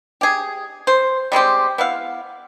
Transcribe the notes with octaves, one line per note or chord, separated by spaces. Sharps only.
G4 G#4
C5
G3 G#3 C4 G4
B3 E4 F5